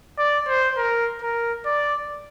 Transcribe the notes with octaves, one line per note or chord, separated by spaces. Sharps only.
D5
C5
A#4
A#4
D5